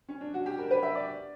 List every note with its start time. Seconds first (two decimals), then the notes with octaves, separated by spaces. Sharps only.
0.09 C#4
0.21 D4
0.34 F#4
0.46 G4
0.58 A#4
0.71 B4
0.83 E5
0.95 D5